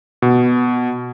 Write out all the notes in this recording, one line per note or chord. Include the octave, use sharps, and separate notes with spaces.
B2